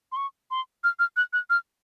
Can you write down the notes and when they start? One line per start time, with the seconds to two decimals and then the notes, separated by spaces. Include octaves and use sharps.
0.12 C6
0.16 C#6
0.51 C6
0.84 F6
0.99 F6
1.17 F#6
1.33 F#6
1.50 F6